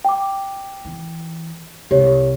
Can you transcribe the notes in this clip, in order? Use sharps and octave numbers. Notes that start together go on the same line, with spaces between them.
G5 D6
E3
C2 G4 C#5